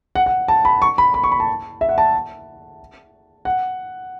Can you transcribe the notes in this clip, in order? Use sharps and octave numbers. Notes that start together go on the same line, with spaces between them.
F#5
F#5
A5
B5
C#6
B5
B5
C#6
B5
A5
E5
F#5
A5
F#5